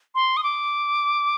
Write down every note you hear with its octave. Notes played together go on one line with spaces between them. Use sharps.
C6
D#6
D6